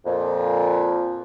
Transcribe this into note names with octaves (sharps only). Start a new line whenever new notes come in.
F2 A#2